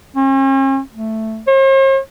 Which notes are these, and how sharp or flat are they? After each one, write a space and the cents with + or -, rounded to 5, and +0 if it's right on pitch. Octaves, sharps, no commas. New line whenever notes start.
C#4 -45
A3 +5
C5 +45